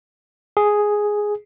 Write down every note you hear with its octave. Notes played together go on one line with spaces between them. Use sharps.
G#4